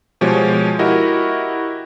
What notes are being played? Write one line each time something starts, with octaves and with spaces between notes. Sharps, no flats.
B2 F3 G#3 G4 C#5
E4 F#4 G4 A#4 D#5